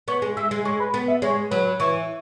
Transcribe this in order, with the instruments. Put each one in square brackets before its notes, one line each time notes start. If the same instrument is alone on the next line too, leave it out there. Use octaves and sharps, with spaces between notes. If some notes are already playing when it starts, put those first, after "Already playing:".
[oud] B3 [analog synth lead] C#5
[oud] G#3
[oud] G#3 [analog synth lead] E5
[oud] G#3
[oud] G#3 [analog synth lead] C#5
[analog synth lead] B4
[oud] B3
[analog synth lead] E5
[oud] G#3 [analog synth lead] C#5
[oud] F#3 [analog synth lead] B4
[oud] E3 [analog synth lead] C#5